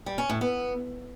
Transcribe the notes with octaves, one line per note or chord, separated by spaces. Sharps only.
G3
C#4
A2
B3